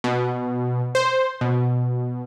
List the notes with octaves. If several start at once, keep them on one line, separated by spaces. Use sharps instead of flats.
B2
C5
B2